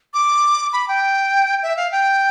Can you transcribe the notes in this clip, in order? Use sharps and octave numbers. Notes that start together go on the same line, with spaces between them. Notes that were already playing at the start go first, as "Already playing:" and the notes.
D6
B5
G5
E5
F5
G5